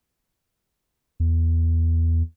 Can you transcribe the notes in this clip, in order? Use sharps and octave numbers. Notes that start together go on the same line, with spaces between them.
E2